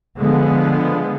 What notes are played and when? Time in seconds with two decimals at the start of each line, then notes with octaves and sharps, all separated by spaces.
0.19 D3 F3 G#3 B3